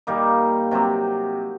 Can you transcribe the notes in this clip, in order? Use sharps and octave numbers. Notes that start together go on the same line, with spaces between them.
A#2 G3 A#3 D#4
C3 F#3 C4 G4